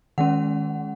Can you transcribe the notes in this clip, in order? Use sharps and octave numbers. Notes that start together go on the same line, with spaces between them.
D#3 G#3 C#4 F#5